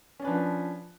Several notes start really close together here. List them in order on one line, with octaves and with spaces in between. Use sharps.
C#4 D4 B4 F3